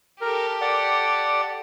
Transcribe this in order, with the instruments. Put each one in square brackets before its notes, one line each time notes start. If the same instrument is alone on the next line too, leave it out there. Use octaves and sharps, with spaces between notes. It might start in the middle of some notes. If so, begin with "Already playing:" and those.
[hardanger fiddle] G4 A4 [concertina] A#4
[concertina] D5 F#5